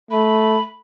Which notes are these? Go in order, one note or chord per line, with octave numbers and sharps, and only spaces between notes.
A3 B5